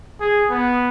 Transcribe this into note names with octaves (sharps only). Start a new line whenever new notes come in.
G#4
B3